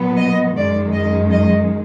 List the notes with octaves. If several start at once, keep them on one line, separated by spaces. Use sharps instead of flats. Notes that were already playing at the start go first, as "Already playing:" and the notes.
Already playing: A#2 F#3 B3
D#5
F#2 D#3 G#3 D5
D#5
D#5